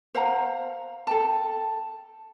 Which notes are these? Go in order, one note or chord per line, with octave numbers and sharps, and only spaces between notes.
C5 F5 F#5 A#5
A4 G5 A5